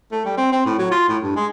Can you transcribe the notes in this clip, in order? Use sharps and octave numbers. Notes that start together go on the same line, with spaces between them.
A3
G3
C4
C4
A2
F#3
F4
A2
G2
G#3